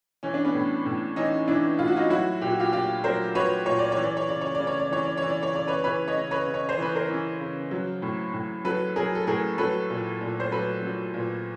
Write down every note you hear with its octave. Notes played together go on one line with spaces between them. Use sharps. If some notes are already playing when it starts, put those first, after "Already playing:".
E3 C#4
D4
B3 C#4
A2
A2
E3 C#4 D#4
E3 D4 E4
A2 F4
F#4
D#4 F4
F#3 E4 F#4
A#2 G4
F#4
F4 G4
A#2 F4 G4
F#3 A#4 C5
F#3 B4 C#5
A#2 C#5
D5
C#5
E3
D5
C#5
C#3 D5
C#5
C#3 D5
C#5
D5
E3 C#5
D5
E3 C#5
D5
C#5
C#3 D5
B4 C#5
E3 B4 C#5
C#5 D#5
C#3
B4 C#5
C#3
C#5
C5
E3 B4
A#4 C5
E3
C#3
F#3
A2
A2
F#3 A4 B4
F#3 G#4 A#4
A4
A2 G#4 A#4
F#3 A4 B4
A#2
A#2
C5
F#3 A4 B4
F#3
A#2